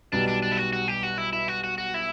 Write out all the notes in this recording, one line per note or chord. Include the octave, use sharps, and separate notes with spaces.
B1 B2 G3 B3 D4
D4
D4
E4
F#4
F#4
G4
F#4
E4
E4
F#4
F#4
F#4
E4